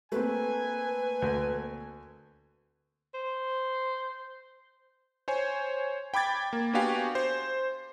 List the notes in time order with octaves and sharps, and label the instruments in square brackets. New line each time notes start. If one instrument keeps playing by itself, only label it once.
[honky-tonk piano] A3 A#3 C4 [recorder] B4 [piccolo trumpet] G#5
[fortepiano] D2
[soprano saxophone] C5
[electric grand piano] C5 C#5 G#5
G5 B5 D6 G#6 A6
A#3
B3 D4 F#4 G4 F5 G#5
C5